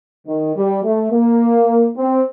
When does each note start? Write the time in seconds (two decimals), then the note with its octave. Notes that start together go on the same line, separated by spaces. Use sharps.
0.27 D#3
0.56 G3
0.84 A3
1.11 A#3
1.97 C4